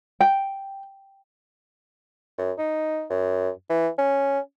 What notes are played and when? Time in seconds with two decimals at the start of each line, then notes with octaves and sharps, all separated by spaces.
0.21 G5
2.38 F#2
2.58 D#4
3.10 F#2
3.70 E3
3.98 C#4